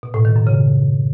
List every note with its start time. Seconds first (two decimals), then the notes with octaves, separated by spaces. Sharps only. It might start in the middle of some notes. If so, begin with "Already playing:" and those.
0.03 B2
0.14 A2
0.25 D#3
0.36 F#2
0.47 C#3